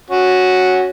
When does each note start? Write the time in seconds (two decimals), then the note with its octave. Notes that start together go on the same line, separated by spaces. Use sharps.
0.10 C#4 F#4